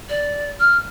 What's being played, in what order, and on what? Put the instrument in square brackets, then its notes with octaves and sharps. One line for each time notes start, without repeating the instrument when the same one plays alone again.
[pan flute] D5
F6